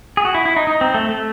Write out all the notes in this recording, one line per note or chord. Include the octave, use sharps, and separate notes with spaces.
G#4
F#4
E4
E4
D#4
D#4
C4
A3
A3